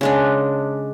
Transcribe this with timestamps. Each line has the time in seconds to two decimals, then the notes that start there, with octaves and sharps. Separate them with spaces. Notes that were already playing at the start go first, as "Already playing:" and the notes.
0.01 C#3 G#3 D4